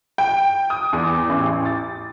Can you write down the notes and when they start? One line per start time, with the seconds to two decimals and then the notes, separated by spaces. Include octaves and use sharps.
0.18 G5
0.70 D#6
0.93 E2
1.29 A1
1.65 A6